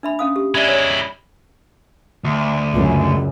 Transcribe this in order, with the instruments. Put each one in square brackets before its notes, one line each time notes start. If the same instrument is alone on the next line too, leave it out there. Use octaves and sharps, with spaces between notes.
[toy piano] D4 E5 B5
C#4 F5 D#6
G4
[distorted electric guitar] G#3 E4 [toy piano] D5 E5 B5
[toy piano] C#5
[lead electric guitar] D2
[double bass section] C#2 F#2